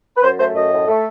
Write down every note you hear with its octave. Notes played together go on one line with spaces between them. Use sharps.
B4
F#2 C5
A3 C5
F#2 D#5
A2
A3